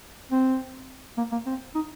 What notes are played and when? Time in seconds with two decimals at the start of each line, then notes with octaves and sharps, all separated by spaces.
0.32 C4
1.18 A#3
1.32 A#3
1.46 C4
1.75 D#4